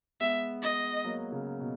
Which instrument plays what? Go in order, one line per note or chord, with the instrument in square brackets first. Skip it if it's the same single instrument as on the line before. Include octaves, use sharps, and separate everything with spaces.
[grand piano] G#3 B3 [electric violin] E5
[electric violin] D#5
[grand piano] F#3 A#3
C#3
B2